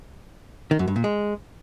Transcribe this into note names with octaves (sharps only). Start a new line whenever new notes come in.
D#3
F#2
G2
A#2
G#3